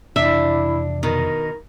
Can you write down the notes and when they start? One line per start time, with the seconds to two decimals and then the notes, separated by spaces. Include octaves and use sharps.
0.16 F2 C3 E3 D4 E4 E5
1.03 B2 D#3 A#4